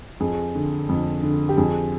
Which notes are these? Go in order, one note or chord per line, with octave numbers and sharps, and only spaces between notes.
F2 G#4
D3
F2
D3
G4
F2 G#4